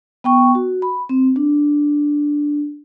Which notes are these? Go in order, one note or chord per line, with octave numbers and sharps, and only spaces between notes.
B3 G5 C#6
F#4
B5
C4
D4